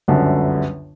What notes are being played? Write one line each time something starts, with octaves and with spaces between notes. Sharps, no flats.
G1 C#2 F#2 D3